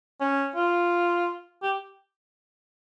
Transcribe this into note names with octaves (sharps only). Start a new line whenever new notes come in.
C#4
F4
G4